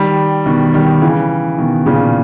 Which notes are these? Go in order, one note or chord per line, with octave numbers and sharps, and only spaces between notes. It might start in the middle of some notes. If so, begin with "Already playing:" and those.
Already playing: D#3 G3
B2 D#3
D#3 G3
C#3 E3
B2 D#3
A#2 C#3